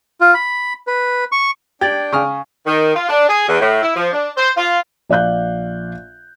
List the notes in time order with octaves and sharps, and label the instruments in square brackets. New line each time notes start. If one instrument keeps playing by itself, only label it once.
[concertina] F4
B5
B4
C#6
[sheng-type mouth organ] D4 G5 [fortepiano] G4 [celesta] G#6 A6 F#7
[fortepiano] C#3 D#6 F6 [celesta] F5 G#5 C#6
[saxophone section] D#3
F4
D4
G#4
E2
A2
E4
F3
D4
C5
F4
[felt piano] A#1 D5 F5 F#6 G6